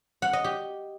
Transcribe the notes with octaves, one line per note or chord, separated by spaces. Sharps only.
F#5
D#5
G4